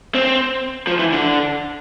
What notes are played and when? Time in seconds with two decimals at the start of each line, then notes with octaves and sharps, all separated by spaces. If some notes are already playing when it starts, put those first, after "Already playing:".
0.15 C4
0.87 F3
0.99 E3
1.12 D3